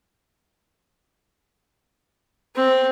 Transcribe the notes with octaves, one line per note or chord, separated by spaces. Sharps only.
C4